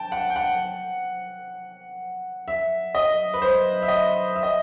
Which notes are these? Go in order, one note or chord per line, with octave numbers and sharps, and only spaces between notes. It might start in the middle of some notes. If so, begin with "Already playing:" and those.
Already playing: G5 A5
F#5
G5
F#5
E5
D#5
B4
C5
E5
D#5
E5
D#5